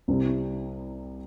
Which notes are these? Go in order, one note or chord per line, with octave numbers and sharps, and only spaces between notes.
C2 C3 G3 C4 E4